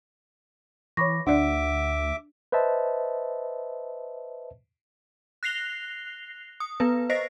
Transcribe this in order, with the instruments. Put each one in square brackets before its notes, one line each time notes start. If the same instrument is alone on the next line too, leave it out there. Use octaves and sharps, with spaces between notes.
[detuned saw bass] E3 [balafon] C#5 C#6 [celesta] B5 D6 A#6
[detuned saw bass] D2 [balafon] D4 D5 [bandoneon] E5 D6 [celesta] F#5
[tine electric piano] B4 C5 D#5 E5 A5
[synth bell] F#6 A#6 C7 F7 G7
D#6
B3 B4
C5 D#5 A#6 C7